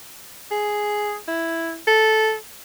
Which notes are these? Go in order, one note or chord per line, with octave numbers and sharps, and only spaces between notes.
G#4
E4
A4